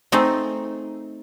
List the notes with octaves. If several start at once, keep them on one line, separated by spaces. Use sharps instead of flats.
A3 C4 D#4 G#4